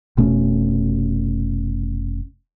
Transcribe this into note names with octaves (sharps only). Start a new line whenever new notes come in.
F1 B2 A3 C#4